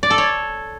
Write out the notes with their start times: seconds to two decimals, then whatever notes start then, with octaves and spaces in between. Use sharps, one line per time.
0.03 D5
0.10 A4
0.18 C#5